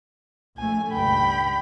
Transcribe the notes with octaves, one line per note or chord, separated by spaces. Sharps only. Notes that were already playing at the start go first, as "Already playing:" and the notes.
A#1 A3 G#5
C#2 G2 G5 B5